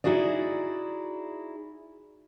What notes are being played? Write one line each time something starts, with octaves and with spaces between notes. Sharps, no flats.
D#4 E4 F#4 G#4 D5